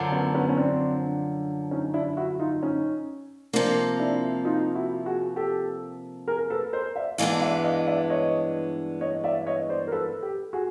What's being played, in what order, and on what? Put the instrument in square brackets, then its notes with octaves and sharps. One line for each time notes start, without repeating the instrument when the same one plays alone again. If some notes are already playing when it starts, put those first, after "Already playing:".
Already playing: [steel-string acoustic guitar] F#2 D3 F3
[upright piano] B3 C#4
B3 C#4
C#4
C4 D4
C#4 D#4
D4 E4
E4 F#4
D#4 F4
C#4 D#4
[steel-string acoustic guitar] C3 F3 A#3 [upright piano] C4 D4
[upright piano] D4 E4
D#4 F4
E4 F#4
F#4 G#4
G4 A4
G#4 A#4
A#4
A4 B4
A#4 C5
D5 E5
[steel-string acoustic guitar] G2 E3 G#3 B3 D4 [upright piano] D#5 F5
[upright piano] D5 E5
D#5 F5
D5 E5
C#5 D#5
C#5 D#5
D5 E5
C#5 D#5
C5 D5
A#4
A4 B4
G4 A4
F#4 G#4